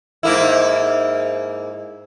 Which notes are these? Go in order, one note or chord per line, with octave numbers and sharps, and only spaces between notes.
G#2 A#3 E4